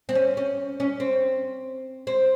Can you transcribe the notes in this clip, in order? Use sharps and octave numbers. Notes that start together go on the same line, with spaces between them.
C4
C#4
C#4
C#4
C4
C4